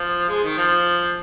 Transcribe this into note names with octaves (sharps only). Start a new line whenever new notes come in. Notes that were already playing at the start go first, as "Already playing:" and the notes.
Already playing: F3
G#3
D#3
F3